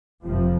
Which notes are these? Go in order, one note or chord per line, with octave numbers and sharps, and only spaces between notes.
F1 F2 C3 F3